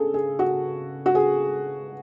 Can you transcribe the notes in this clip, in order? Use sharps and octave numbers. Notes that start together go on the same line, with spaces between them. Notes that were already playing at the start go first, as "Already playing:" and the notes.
Already playing: C#3 G#4 A4
G#4
F#4
F#4
G#4